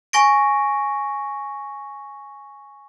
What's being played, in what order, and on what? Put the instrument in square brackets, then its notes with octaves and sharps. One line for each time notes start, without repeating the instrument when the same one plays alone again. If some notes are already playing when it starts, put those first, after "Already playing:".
[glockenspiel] G#5 C#6 A#6 D7